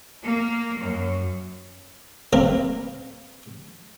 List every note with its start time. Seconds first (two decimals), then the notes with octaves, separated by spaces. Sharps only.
0.25 A#3
0.77 F#2
2.33 A#3 C4 A#4 B4 F5